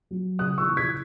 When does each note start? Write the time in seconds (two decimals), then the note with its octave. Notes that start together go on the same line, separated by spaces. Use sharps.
0.11 F#3
0.39 C#3 D#6 F#6
0.58 C#6 E6
0.68 E3
0.77 G#6 B6